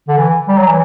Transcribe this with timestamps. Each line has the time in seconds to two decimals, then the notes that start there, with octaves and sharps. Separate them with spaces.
0.08 D3
0.18 E3
0.48 G3
0.58 F#3
0.67 E3